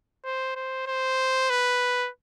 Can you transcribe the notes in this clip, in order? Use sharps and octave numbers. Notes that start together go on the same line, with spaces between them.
C5
C5
C5
B4